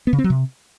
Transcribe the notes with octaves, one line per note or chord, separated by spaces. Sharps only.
B3
C#3
C4
F#3
C3